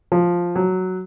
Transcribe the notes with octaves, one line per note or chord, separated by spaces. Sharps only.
F3
F#3